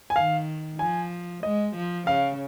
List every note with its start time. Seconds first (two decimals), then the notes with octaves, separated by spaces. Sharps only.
0.10 G#5
0.15 D#3 F5
0.79 F3 G#5
1.43 G#3 D#5
1.76 F3
2.07 C#3 F5